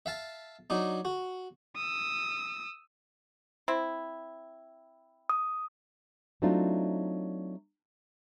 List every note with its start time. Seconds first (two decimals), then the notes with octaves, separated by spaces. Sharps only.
0.06 E5 F5 A5
0.70 F#3 D4 D#4
1.05 F#4
1.76 D#6 E6
3.68 C4 E4
5.29 D#6
6.42 F#3 A3 C4 D4 D#4 F4